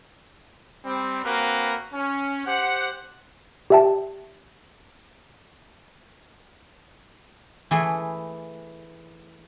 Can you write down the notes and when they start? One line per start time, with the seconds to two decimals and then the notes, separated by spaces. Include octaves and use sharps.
0.85 G3 C4
1.25 A#3 C4 F#4 A#4 B4
1.94 C#4
2.46 G4 C5 F#5
3.70 G4 D5 E5 G5 A5
7.71 E3 A3 G#4